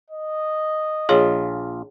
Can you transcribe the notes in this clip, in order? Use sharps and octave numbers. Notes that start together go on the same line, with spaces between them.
D#5
A#1 F4 G#4 C#5